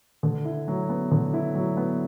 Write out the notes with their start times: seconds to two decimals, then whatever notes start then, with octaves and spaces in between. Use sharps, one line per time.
0.23 D3
0.45 E4
0.68 F#3
0.89 B3
1.11 D3
1.33 E4
1.55 F#3
1.77 B3